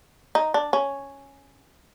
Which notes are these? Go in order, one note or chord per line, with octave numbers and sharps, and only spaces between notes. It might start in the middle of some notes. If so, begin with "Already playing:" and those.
D#4
D4
C#4